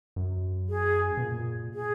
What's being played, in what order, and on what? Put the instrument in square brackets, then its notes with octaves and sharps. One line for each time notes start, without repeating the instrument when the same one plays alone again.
[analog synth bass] F#2
[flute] G#4
[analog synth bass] B2
A#2
[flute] G#4